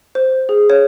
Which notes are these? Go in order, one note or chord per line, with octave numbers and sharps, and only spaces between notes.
C5
G#4
C#5